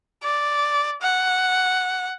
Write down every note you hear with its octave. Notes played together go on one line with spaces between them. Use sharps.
D5
F#5